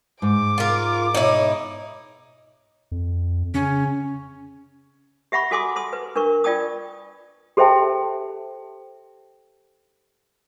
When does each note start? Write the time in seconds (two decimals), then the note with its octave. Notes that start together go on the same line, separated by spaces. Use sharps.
0.22 G#2 D6
0.58 F4 A#4
1.15 B2 D#4 E4 C#5 E5
2.91 F2
3.54 C#3 C#4
5.32 G4 E5 F#5 B5 C#6
5.51 F#4 A4 G#5 C6 D6 D#6
5.76 A5 C6 D#6
5.93 B4
6.16 D4 A#4 B4 C#6
6.44 F4 D5 G5 A5 D#6
7.57 G4 A4 C5 E5 G5 A5